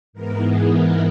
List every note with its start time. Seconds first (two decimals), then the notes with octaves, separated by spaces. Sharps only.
0.13 G#2 E3 B3 A#4
0.41 G#4
0.70 A#4